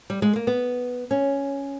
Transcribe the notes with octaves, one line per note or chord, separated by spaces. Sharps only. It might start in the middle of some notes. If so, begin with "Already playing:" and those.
G3
G#3
A#3
B3
C#4